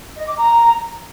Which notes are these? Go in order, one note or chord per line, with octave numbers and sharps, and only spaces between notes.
D#5
D6
A#5